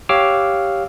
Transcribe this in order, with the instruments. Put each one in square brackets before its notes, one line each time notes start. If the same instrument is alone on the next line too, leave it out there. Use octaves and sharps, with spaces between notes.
[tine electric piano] G4 C#5 F5 D6 E6 F6